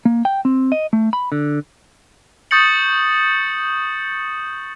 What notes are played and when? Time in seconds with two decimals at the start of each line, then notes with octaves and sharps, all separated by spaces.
0.05 A#3
0.25 G5
0.45 C4
0.72 D#5
0.93 A3
1.13 B5
1.32 D3
2.51 C#6 D#6 G6 A6 C#7 F#7